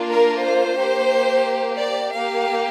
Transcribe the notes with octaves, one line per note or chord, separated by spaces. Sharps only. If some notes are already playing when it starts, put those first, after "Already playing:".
Already playing: A#3 D4 F4
A#4
C5
A#3 G4
D5
A#3 G4 F5